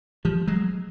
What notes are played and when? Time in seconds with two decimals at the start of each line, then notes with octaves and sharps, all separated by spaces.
0.25 F3 G3
0.47 F#3 G#3